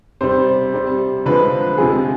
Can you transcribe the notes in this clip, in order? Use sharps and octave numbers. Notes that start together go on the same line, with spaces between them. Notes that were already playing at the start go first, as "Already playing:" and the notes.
C3 G3 C5
C3 G3
D3 F3 G#3 B4
C3 F3 G#3 G#4